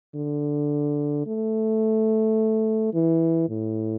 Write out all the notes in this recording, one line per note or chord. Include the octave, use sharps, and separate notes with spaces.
D3
A3
E3
A2